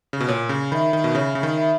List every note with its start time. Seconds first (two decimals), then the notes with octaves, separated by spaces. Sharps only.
0.13 C#3
0.20 B2
0.28 A#2 C#5
0.49 C#3
0.71 D#3 E5 B5
0.93 D#3
1.04 B2
1.15 C#3 C#5
1.35 C#3
1.43 D#3
1.58 E5 B5